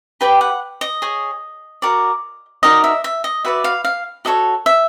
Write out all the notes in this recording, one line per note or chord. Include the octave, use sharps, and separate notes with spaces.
G4 B4 D5 G5
F#5
D#5
G#4 C#5
F#4 A#4 D5
D#4 F#4 A#4 D5 D#5
E5
E5
D#5
F#4 B4 D5 E5
F5
F5
F#4 A4 C#5 D#5
E5